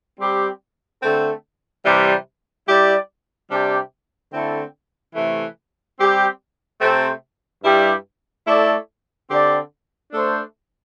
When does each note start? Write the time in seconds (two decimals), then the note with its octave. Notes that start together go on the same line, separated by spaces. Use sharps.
0.18 G3 C4 G4
1.02 D3 A3 C4 A4
1.84 C3 E3 G3
2.66 G3 E4 G4 D5
3.49 C3 G3 D4 G4
4.32 D3 A3 C4 E4 A4
5.15 C3 E3 A3
5.98 G3 C4 G4
6.81 C3 A3 C4 A4 C5
7.63 G2 G3 E4 G4
8.46 A3 E4 A4 D5
9.29 D3 C4 G4 D5
10.12 A3 D4 A4 C5